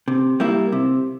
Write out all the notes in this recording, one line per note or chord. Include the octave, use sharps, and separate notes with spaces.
C3
G3 A#3 E4
C3